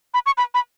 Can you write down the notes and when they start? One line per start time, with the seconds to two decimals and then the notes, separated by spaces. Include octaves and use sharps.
0.14 B5
0.26 C#6
0.38 B5
0.54 B5